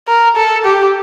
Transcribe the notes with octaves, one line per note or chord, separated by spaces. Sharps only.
A#4
A4
G4